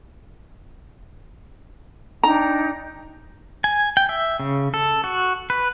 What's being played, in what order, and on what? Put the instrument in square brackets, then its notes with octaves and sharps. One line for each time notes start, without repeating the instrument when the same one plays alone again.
[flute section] D4 D#4 G5 [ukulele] A#5
[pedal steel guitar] G#5
G5
E5
C#3
A4
F#4
B4